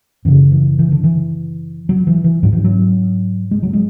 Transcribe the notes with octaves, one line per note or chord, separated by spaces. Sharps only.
F#2 C#3 E3
E3
E3
D3
E3
F#3
E3
E3
G#2 F#3
E3
F#3
G#3
F#3
G#3